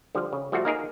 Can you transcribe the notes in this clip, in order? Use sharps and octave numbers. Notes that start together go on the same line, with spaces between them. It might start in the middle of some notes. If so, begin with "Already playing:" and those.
D3 F3 G3
C#3
F3 G3 A3 F4 F#4
A#3 D#4 G#4 A#4